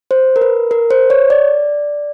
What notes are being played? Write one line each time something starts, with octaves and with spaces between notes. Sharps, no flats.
C5
A#4
B4
A#4
C5
C#5
D5